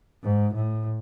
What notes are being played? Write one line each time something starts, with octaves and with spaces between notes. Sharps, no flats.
G#2
A2